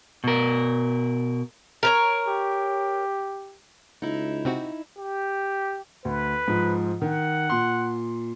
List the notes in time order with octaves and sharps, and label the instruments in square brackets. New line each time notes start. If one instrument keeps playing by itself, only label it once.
[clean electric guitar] B2 A#4
[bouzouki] A#4 B4 C#5
[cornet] G4
[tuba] C#2 [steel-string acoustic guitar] D#4 E4
[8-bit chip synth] C3 C4 F#4
[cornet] G4
[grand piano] D2 [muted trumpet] B4
[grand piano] G#2 F3
[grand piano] D#3 [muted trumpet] F#5
[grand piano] A#2 C6